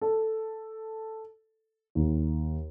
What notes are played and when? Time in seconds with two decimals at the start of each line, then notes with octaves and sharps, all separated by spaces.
0.02 A4
1.95 D#2